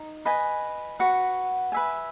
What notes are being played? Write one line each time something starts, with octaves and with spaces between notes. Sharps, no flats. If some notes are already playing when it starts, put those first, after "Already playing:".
Already playing: D#4
B4 D#5 G#5
F#4 B4 F#5
B4 E5 G#5